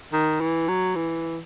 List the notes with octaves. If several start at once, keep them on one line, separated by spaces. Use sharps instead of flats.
D#3
E3
F#3
E3